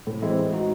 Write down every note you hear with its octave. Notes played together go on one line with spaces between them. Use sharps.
A2
E3 G#3 C4 E4
G#3
D#4 F#4